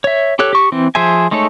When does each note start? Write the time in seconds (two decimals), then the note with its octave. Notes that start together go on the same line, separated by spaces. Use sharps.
0.04 C#5 E5
0.39 G4 A4 C#5 F#6
0.53 G4 C#6
0.72 E3 C4
0.95 F3 G#4 C5 E5 G#5
1.31 G#3 A3 D#4 A4 C#5